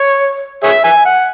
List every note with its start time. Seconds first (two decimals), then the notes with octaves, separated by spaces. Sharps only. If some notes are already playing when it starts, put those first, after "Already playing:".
Already playing: C#5
0.64 G#4 C#5 E5
0.84 E5 G#5
1.05 F#5